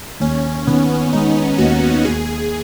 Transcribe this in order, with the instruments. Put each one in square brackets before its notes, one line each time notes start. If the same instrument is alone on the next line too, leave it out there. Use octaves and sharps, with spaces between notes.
[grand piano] D#2 [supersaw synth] C#4
[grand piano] D#3 [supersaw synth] B3
[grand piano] G#3 [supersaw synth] D#4
[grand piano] D#2 [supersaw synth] F#4
[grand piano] D#2 [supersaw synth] G#4